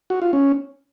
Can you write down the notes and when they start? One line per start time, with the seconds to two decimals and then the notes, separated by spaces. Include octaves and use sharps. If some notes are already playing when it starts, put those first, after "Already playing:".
0.10 F#4
0.22 F4
0.33 C#4